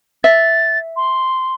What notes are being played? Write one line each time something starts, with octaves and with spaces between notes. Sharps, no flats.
E5 A6
C6